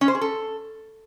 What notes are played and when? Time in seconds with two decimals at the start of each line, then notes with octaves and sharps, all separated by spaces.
0.01 C#4
0.08 C5
0.15 G#4
0.21 A4